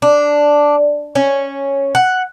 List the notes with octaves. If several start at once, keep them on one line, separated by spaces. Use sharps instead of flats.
D4
C#4
F#5